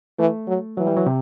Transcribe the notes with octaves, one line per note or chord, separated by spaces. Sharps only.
E3 A3
F#3
E3 F#3
G3
F#3
C3